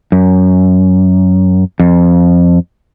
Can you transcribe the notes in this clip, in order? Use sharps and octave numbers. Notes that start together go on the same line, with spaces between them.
F#2
F2